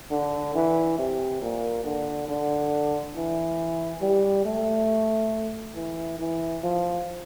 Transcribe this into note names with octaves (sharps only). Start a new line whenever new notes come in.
D3
E3
C3
A#2
D3
D3
E3
G3
A3
E3
E3
F3